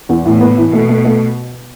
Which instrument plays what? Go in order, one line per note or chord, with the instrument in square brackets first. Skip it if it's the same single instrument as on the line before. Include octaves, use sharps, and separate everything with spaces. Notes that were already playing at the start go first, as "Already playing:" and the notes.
[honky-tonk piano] E2
[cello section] A2 [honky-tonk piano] E3
[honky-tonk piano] B3
E3
[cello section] B2 [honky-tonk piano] A3
[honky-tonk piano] A3
A3